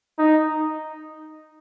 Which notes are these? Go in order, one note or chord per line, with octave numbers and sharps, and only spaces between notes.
D#4